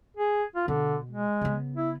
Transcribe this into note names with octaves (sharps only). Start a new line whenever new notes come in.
G#4
F4
B2 D3
G#3
C#3 B3
E4